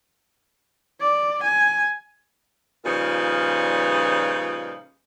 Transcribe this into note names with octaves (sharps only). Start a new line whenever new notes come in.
D5
G#5
A#2 C#3 F3 G3 D#4 B4